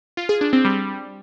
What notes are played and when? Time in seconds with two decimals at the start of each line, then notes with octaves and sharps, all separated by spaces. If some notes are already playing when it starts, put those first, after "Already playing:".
0.17 F4
0.29 G#4
0.41 D4
0.53 C4
0.65 G3